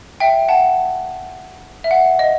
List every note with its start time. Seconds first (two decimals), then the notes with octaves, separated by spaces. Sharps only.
0.20 E5 G5
0.49 F#5 A5
1.84 E5
1.91 F#5
2.19 D#5